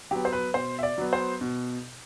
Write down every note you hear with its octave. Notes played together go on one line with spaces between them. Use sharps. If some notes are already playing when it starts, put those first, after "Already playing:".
F#3 B3 G4
C5
B4
B2 C5
E5
D5
F#3 B3
C5
B2